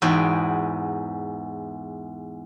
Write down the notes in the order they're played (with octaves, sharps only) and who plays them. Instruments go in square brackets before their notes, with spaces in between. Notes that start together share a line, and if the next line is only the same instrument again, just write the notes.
[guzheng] E2 G#2 F#4 G5